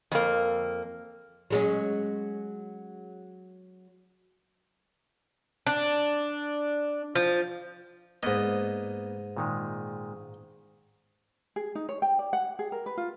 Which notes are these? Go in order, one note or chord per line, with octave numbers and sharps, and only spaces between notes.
F2 A#3
F#3 G#3 C#4
D4
F3
G#2 A#3 B3 D5 D#5
A#2 D#3 G#3
G#4
D#4
C#5
G5
D5
F#5
G#4
A#4
B4
F4